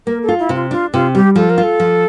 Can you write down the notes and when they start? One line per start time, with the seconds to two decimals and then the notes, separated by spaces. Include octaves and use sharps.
0.07 A#3 A#4
0.23 A4
0.29 F4
0.39 E4
0.49 C3
0.55 F4
0.71 D4 F4
0.93 C3 F4
1.15 G3 G4
1.36 F3 A4
1.50 A#4
1.58 F4
1.63 A4
1.80 F3